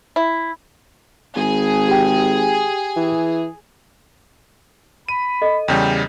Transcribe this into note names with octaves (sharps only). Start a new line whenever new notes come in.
E4
G#1 G#4
G4 G5
E3
B5 D#7
A4 D#5
E2 C#3 G3 G5